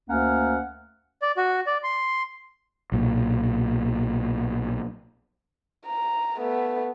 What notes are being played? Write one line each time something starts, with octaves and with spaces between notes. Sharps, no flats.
D2 A#3 C#4 F#5 F6
D5
F#4
D5
C6
B1 A#2
A#5
A3 B3